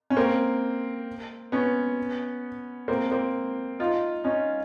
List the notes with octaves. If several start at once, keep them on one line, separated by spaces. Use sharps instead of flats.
C#4
A#3 C4
B3 C#4
A#3 C4
A#3 C4
D#4 F4
C#4 D#4